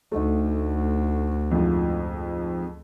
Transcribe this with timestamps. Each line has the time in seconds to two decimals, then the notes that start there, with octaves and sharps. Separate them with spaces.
0.12 D2 A3 D#4
1.51 F2 G#2 F3